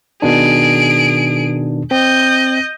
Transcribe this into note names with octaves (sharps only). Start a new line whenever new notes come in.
B2 D#3 D4 G#4 D7
C4 D#5 G6